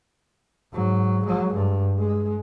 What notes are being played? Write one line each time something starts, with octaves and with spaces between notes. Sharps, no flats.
G#2 F#3
F#3 G#3
G2
G#3